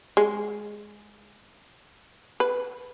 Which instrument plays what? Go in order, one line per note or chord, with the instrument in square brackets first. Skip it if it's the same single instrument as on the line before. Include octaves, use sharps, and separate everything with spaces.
[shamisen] G#3
B4